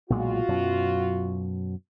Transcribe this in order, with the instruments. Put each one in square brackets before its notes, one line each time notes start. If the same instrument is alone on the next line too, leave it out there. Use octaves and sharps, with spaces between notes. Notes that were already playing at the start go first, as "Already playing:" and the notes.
[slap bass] B1 A#2 G#3 [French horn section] F4 F#4
[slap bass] F#2 B2 F#3